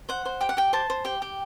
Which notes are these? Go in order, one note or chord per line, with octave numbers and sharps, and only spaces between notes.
C5 F#5
C5
G4 G5
F#5
G4 G5
C5 A5
C5
G4 G5
G4